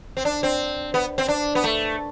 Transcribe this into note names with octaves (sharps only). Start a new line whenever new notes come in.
C4
D4
C4
B3
C4
D4
B3
A3